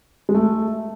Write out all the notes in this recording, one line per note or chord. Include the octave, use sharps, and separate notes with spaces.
G#3
A3